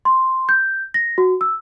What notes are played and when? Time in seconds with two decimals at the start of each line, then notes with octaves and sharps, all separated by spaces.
0.05 C6
0.49 G6
0.94 A#6
1.18 F#4
1.41 E6